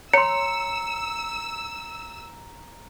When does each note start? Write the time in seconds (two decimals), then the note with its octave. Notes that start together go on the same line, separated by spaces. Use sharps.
0.14 C#5 A#5 C6 E6 C#7